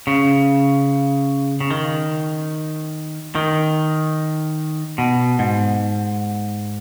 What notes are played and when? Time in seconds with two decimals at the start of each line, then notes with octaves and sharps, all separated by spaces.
0.07 C#3
1.61 C#3
1.71 D#3
3.35 D#3
4.98 B2
5.39 G#2